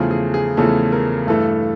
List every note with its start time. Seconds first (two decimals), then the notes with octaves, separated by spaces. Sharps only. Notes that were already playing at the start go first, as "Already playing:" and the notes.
Already playing: E2 C#3 F3 A3 G#4
0.11 G#4
0.34 G#4
0.57 E2 C#3 F3 A3 A4
0.92 A#4
1.27 G2 E3 A3 A4